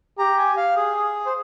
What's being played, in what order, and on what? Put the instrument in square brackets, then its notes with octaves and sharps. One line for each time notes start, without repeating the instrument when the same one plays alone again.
[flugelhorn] G4 [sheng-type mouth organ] A#5
[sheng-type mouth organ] G#5
F5
G#4
C5